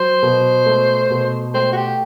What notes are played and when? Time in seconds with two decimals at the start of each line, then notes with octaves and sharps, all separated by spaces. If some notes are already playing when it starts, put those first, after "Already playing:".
Already playing: F#3 C5
0.22 B2
0.66 A3
1.10 B2
1.54 A3 C5
1.73 F#4
1.76 G4